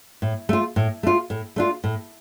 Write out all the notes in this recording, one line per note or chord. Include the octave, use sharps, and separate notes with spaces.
A2
A3 F4
A2
A3 F4
A2
A3 D4 F4
A2